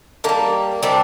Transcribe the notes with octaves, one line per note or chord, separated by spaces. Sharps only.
D3 G3 A#3
C3 G3 D4